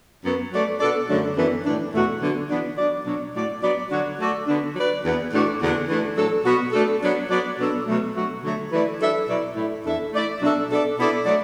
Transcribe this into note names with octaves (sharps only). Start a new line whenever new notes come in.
F#2 F#3 B3
F#3 A3 F#4 D5
B2 B3 D4 A4 D5
F#2 D3 F#3 A3 D4
F#2 E3 B3 D4 A4
A2 E3 D4
E2 B2 A3 F#4
D3 F#3 B3 D4
E3 B3 D4
F#3 D4 F#4 D5
B2 F#3 D4
A2 A3 F#4 D5
F#3 B3 F#4 D5
D3 F#3 D4 F#4
A3 F#4 A4 D5
D3 B3 D4
F#3 D4 F#4 B4 D5
E2 E3 B3
A2 A3 D4 F#4 D5
E2 D3 B3 D4
E3 A3 D4
A2 F#3 D4 A4
B2 B3 F#4
A3 D4 A4
F#3 B3 D4
F#3 B3 F#4 D5
B2 F#3 B3 D4 A4
B2 F#3 A3
B2 F#3 A3 F#4
D3 F#3 A3
E3 A3 E4 B4 D5
F#3 D4 A4 E5
B2 F#3 B3 E4 D5
A2 A3 E4
E2 E3 D4 A4 E5
A3 E4 D5
B2 F#3 D4 A4 E5
B2 B3 D4 A4 D5
B2 B3 E4 A4 D5
F#3 A3 F#4 D5